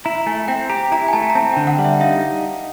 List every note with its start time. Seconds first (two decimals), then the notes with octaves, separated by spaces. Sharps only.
0.05 E4 A#5
0.26 A3 G#5
0.48 C4 G5
0.70 G4 A#5
0.92 E4 A#5
1.08 G#5
1.13 A3 A5
1.30 A#5
1.35 C4 A5
1.52 D3 G5
1.67 F#5
1.78 G3
1.85 E5
2.01 D#4 F5